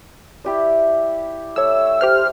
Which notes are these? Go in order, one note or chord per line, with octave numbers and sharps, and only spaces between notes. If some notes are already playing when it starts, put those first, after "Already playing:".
E4 G4 D5
A3 C#5 E6
G4 C5 F6